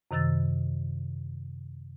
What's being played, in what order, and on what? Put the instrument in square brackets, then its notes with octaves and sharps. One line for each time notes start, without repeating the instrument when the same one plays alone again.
[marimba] F#2 C3 D#3 E6 A6